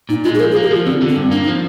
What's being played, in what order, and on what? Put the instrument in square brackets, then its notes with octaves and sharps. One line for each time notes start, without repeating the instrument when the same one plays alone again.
[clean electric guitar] A#2 [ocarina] D#4
[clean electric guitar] G#3 [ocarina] F4
[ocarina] G#4
[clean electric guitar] F3 [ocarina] A#4
[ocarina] G#4
[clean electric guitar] A#3
[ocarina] G4
[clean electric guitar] F3 [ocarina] F4
[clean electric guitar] D3 [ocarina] C4
[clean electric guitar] D3
[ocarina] C4
[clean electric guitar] G2
[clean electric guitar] A#3 [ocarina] D4
[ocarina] D#4
[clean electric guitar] F3